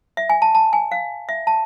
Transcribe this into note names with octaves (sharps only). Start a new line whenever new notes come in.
E5
G#5
A5
A5
G#5
F5
E5
A5